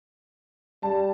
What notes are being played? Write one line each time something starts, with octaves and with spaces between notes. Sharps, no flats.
G3 A5